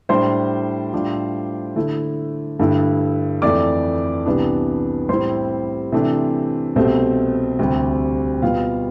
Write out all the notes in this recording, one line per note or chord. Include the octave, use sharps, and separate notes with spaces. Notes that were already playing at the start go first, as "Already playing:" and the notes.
A2 G3 D4 C5 C6
A2 G3 D4 F4
D3 A3 E4
G2 D3 A3 E4
F2 E3 A3 D5 D6
C2 C3 E3 B3 D4
A2 G3 C4 E4 C5 C6
C3 E3 A3 D4
C2 B2 A3 C4
D2 C3 G3 C4
B2 G3 B3 F4 F5